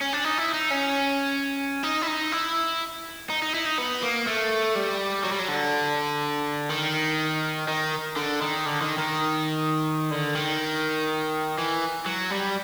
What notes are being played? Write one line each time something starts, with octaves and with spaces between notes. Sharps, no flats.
C#4
D4
D#4
E4
D#4
C#4
D#4
E4
D#4
E4
D#4
D#4
E4
D#4
B3
A#3
A3
G3
F#3
G3
F#3
D3
D#3
D#3
D3
D#3
D3
D#3
D#3
D3
D#3
E3
F#3
G3